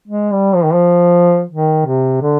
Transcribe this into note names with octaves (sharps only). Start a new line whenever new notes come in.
G#3
G3
F3
D#3
F3
D#3
C3
D3